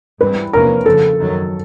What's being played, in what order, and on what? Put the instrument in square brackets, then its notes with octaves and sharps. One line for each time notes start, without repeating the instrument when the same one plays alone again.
[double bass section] G#2 E3 G3 C4 [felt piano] B4
[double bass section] E2 C3 F3 A#3 C#4 [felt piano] A#4
[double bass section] F2 C#3 F3 [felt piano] A4
[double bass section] F#2 D#3 F#3